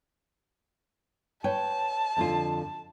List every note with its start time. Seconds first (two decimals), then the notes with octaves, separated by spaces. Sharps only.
1.44 B4 C#5 G5 A5
2.17 F2 D3 F4